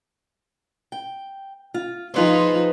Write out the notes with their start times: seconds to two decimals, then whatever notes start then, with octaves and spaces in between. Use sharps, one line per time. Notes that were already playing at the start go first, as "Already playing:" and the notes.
0.92 G5
1.74 F4
2.14 F3 D#4 F4 G#4 B4 C5